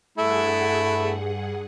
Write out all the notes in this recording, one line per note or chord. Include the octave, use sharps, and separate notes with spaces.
G2 A3 E4 G#4 F#5